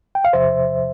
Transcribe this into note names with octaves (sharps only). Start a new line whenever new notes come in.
G5
F5
E2 C3 F3 C5 E5